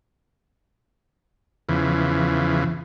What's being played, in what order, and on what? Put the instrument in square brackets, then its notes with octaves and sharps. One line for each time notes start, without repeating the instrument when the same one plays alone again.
[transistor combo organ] E2 C#3 E3 F3